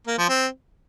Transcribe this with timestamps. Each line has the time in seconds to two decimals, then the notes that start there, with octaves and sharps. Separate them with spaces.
0.07 A#3
0.18 F3
0.29 C4